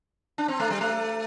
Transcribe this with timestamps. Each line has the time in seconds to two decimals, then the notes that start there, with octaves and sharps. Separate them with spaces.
0.38 D4
0.48 C4
0.60 A3
0.70 G3
0.81 A3